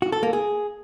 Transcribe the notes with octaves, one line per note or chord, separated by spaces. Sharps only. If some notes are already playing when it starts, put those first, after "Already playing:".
F#4
A4
A#3
G#4